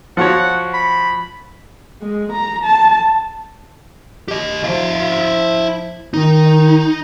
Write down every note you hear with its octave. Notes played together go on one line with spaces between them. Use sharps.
F3 F#4 C#5 F#5
B5
G#3
A#5
A5
G4 D#5
F3 E4 F5
D#3 D#4